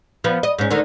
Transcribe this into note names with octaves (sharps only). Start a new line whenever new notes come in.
F3 B3
D#5
G#2 C#4
D2 D3 D#3